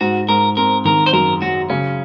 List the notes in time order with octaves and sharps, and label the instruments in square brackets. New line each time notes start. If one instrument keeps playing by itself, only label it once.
[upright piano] G#2 [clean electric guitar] F#4
[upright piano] G#2 [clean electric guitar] A#4
[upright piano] C4 [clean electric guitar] A#4
[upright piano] D#3 [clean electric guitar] A#4
[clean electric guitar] C5
[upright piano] F#2 [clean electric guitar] A#4
[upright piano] F#3 [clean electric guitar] F#4
[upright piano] C#3 [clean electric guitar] C#4